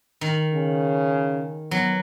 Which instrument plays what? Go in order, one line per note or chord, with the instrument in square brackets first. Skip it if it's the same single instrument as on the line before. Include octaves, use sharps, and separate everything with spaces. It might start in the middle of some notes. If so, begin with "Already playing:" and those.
[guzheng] D#3
[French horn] C#3
[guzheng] F#3 [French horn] B3